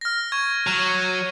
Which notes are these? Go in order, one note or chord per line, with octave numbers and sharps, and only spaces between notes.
F6 A#6
C#6 G#6
F#3 F6 D#7